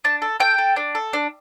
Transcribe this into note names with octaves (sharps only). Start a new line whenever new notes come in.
D4 A5
A4
A4 G5
A4
D4
A4
D4